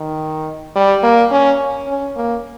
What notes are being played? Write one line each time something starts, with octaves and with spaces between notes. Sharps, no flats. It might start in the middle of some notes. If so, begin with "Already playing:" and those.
Already playing: D#3
G3
A#3
C#4
C#4
A#3